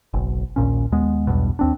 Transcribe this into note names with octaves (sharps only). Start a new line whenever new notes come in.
F#1 B1
A#1 D#2 A#2 C#4
D#2 G#3 B3
B1 E2 G2 B2
D#2 C4 D4